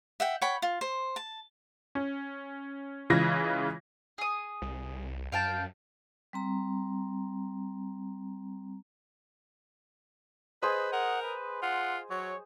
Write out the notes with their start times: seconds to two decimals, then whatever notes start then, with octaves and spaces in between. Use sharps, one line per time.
0.20 E5 F#5 G5
0.41 C#5 F#5 G5 B5
0.62 F4
0.81 C5
1.16 A5
1.95 C#4
3.10 C#3 E3 G#3 F4 G#6 A#6
4.18 G#4 D#6
4.62 C2
5.32 F#2 F5 G5 A5
6.33 G3 C4 A#5
10.62 G#4 B4 C5 D#5
10.93 A#4 F#5
11.23 B4
11.63 F4 F#5
12.10 F#3 C#5